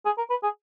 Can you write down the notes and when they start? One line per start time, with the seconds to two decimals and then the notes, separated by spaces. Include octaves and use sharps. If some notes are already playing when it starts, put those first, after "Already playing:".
0.05 G#4
0.18 A#4
0.30 B4
0.43 G#4